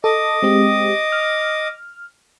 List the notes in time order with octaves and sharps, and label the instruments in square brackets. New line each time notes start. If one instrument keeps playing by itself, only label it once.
[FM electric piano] A4 [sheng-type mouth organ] D#5 D6 D#6
[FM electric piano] G#3 C4 G4
F6